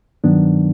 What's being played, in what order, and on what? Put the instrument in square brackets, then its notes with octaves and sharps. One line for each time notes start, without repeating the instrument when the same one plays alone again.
[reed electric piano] G2 D#3 F#3 B3 D4